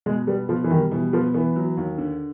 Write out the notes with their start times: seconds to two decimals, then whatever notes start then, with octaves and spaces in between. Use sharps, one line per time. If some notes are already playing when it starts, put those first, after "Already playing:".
0.06 B2 G#3
0.27 G3 B3
0.49 B2 F3
0.64 E3
0.70 D#3 G3
0.91 B2 E3
1.13 F3 B3
1.34 E3 B3
1.56 F#3
1.77 D#2
1.98 D3